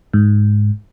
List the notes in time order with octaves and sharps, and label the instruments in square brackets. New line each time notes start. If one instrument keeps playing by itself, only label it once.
[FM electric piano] G#2